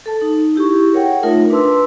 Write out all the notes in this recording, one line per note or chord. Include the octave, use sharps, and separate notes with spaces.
A4 A5
D#4
E4 G4 G#4 C#6
G#4 A#4 C#5 F#5 G5
A3 D#4 F4 A#4 C#5 E5
D4 B4 A5 C6 E6